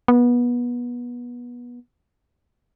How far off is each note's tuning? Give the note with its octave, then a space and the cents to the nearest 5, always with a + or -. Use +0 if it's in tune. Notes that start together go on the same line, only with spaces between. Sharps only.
B3 -25